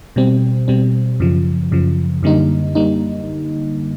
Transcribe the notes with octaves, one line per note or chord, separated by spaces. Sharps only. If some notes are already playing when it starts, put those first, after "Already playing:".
B2 G3 C4
B2 G3 C4
F#2 C#3 F3
F#2 C#3 F3
F#2 D3 G3 A#3 D#4
G3 A#3 D#4